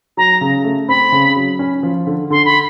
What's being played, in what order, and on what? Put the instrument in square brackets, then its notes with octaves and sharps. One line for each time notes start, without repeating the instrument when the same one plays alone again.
[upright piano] F#3 [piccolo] A#5
[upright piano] C#3
A3
[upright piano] C4 [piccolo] B5
[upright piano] C#3
F#3
C#4
F3
D3
[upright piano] D3 [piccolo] C6
[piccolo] B5